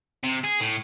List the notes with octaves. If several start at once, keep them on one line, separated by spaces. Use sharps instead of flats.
C3
G#4
A2